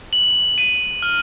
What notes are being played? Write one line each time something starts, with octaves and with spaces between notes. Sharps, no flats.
F#7
D#7
F6